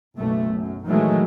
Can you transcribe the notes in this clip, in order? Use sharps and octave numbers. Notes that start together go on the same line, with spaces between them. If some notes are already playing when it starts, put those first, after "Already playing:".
F#1 B1 B2 A3
F#2
A#2 D#3 E3 F#3 G#3 A3